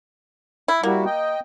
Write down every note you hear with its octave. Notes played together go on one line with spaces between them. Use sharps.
E4
G3 A#3 E4 F#4
D#5 G5